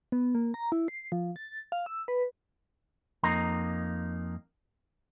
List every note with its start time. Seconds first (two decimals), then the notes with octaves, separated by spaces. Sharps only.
0.12 B3
0.35 A#3
0.54 A#5
0.72 E4
0.88 C7
1.12 F3
1.36 A6
1.72 F5
1.86 E6
2.08 B4
3.23 F2 A#3 D#4 A#5